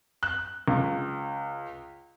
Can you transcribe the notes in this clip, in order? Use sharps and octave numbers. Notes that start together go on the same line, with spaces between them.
F#6
C#2